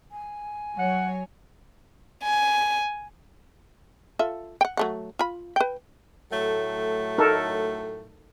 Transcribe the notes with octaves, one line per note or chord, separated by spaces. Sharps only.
G#5
F#3 C#5 F#5
G#5
F4 A4 E5
F#5 G5
F#3 A3 F#5
F4 B5
B4 G5
A2 F#3 A3
D#4 A4 A#4